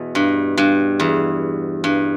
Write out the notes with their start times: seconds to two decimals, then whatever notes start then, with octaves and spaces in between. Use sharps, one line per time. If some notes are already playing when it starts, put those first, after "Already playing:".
Already playing: E2 B2
0.15 G2
0.57 G2
1.00 E2
1.84 G2